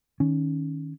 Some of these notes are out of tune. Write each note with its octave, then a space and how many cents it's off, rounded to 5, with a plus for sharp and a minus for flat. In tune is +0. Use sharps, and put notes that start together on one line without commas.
D#3 +0 C#4 +5